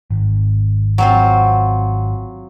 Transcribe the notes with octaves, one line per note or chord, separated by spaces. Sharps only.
G#1
F#3 C4 F4